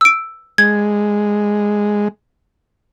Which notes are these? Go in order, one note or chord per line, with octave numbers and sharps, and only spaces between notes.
E6 D7
G#3 G#6